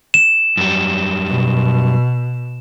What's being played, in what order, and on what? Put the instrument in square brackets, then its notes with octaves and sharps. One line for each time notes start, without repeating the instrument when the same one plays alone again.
[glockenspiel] E7
[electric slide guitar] F#2 G3
[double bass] B2